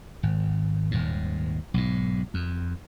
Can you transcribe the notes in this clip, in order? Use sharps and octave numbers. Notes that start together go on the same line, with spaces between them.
G#1
D#1 G#2
B1 G#2
F2